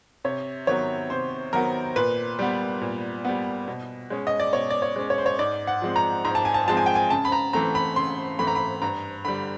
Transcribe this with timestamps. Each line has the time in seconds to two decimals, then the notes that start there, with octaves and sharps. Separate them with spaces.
0.25 C3 C#5
0.67 D#3 F#3 B3 C#5
1.10 C3 C5
1.53 D#3 F#3 B3 A#4
1.96 A#2 B4
2.39 G3 B3
2.81 A#2
3.25 G3 B3
3.68 B2
4.10 G#3 C#4
4.27 D#5
4.40 D5
4.53 B2 C#5
4.70 D5
4.82 C#5
4.96 G#3 C#4
5.10 C#5
5.18 C5
5.26 C#5
5.39 G#2 D5
5.67 F#5
5.82 F3 G#3 C4
5.96 A#5
6.25 G#2 A#5
6.35 A5
6.45 G#5
6.54 A5
6.68 F3 G#3 C4 A5
6.77 G#5
6.86 G5
6.95 G#5
7.10 C#3 A5
7.25 B5
7.32 A#5
7.53 E3 A3 C4 A#5
7.75 B5
7.96 C#3 C6
8.39 E3 A3 C4 B5
8.47 A#5
8.55 B5
8.82 G2 A#5
9.25 D3 G3 B5